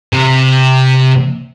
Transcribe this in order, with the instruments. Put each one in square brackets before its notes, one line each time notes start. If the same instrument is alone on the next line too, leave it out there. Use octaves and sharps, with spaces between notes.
[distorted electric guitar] C3